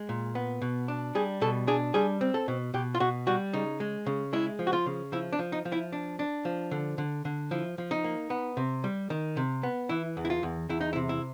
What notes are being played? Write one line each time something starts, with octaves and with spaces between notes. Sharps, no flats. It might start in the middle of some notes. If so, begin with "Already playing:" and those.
Already playing: G#3
A#2
B3
B2
D4
G3 G#4
B2 A4
D4 G#4
G3 G#4
C4
A4
B2
B2 G4
F4
B2 F#4
G3 F#4
C#3 D#4
G#3
C#3
G#3 E4
F3
F#4
F4
C#3
F3 E4
D4
F3
D#4
F3
E4
D4
D4
F3
D3
D3
D3
F3 E4
F3
D#4
A#3
B3
C3
G3
D#3
C3
B3
E3 E4
E2
E4
F4
E2
E2 E4
D#4
E4
C3
E4